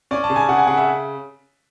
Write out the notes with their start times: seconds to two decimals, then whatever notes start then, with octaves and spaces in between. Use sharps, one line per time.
0.11 C#4 D5
0.24 A5
0.30 C#3
0.36 G#5
0.49 C#3 F#5
0.58 G#5
0.67 C#3 F#5
0.77 E5